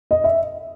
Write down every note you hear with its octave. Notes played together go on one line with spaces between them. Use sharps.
D#5
E5